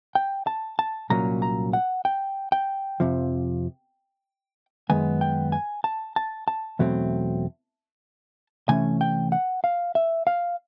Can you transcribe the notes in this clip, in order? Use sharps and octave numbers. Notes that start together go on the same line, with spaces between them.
G5
A5
A5
C2 A#2 F#3 A#3 C#4 A#5
A#5
F#5
G5
G5
F2 C3 F3
F#2 D#3 G#3 B3 G#5
G5
G#5
A5
A5
A5
E2 B2 F#3 A3 C4
C3 E3 A3 C#4 G#5
G5
F#5
F5
E5
F5